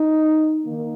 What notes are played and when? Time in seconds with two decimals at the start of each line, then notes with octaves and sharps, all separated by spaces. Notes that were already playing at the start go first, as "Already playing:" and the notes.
Already playing: D#4
0.63 D#3 A#3